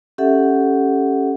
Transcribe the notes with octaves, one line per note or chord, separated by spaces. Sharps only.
C#4 G4 A4 E5 F#5